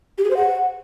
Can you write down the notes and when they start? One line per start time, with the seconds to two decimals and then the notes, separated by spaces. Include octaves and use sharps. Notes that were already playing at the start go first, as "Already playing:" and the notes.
0.18 G4
0.24 G#4
0.31 C5
0.37 F#5